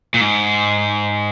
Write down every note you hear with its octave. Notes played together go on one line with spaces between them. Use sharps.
A#2
G#2